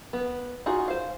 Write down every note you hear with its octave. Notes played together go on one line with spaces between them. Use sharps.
B3
D#4 F4 F#4 G#4
C5 F5